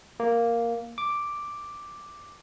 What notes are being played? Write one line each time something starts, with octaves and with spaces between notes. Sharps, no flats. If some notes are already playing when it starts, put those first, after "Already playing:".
A#3
D6